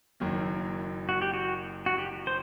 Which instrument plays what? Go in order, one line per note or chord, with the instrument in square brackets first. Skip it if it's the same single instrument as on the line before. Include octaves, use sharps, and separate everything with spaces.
[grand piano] F#1 F#2 D#3 F#3 A#3
[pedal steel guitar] F#4
G4
F#4
F#4
G4
C5